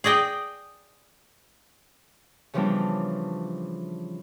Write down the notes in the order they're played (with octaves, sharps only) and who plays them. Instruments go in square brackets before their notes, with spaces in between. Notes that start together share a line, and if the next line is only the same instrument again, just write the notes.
[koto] G#4 D5 D#5 G5
[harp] C#3 E3 F3 G3 B3 D4